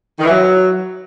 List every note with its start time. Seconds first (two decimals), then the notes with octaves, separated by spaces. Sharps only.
0.19 D#3
0.24 E3
0.29 F#3